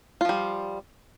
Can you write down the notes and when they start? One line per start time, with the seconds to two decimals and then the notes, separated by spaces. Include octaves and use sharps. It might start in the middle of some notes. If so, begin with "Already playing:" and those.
0.21 F4
0.25 F3
0.29 G3